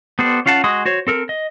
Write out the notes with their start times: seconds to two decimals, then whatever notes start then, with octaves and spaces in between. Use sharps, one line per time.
0.19 B3 G4 A4 C5 D5
0.46 C#4 F4 F5 F#5 A5
0.64 G#3 F#4 C6 D#6
0.86 F#4 C5 C#5
1.07 C4 A4 A#4
1.29 D#5